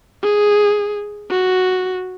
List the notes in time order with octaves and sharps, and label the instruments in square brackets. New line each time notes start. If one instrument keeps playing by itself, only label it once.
[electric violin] G#4
F#4